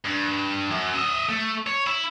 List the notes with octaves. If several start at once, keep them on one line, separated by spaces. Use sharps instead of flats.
G2
F#2
D#5 E5
A3
C#5
E4